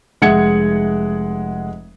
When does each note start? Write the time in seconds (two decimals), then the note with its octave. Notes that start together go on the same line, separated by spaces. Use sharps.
0.22 F1 G#3 E5 F#5 G#6 C#7